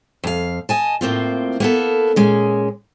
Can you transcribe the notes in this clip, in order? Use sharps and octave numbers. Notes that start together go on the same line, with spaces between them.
F2 F5
D#5 G#5 A5
A2 A#3 C4 F4
A#3 B3 A4
A#2 G#3 C#4